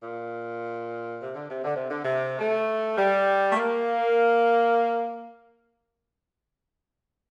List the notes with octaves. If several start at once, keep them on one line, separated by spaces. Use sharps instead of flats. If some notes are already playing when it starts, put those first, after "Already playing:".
A#2
C3
D3
C3
D3
C3
D3
C3
A3
G3
A3
A#3